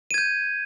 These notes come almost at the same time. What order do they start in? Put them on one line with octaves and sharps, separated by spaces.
D#7 G#6 G6